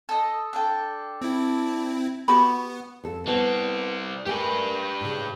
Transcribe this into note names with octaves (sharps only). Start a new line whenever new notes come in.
A4 D#5
D4 A4 G5
C4 E4
B3 F#4 G4 B5 C#6
F2 A4
G3 B3 C4 A5
A3 G4 A#4 B4 G#5
A2 C#3